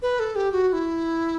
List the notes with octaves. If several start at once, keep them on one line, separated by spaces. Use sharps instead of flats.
B4
A4
G4
F#4
F#4
E4